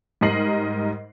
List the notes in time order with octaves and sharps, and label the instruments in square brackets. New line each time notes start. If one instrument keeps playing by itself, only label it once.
[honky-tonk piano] G#2 G3 A#4 D#5 C7 F#7